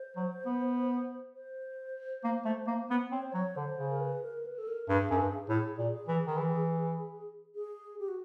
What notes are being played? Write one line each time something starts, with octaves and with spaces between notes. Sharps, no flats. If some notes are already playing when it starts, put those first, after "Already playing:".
Already playing: C5
F#3
B3
C5
A#3
A3
A#3
B3
C4 C#5
C5
F#3 C#5
D3 C5
C#3
A#4
B4
A#4
B4
A4
A#4
G2 G#4
F#2
G2
A2
A#2
E3
D#3
E3
G#4
G4
F#4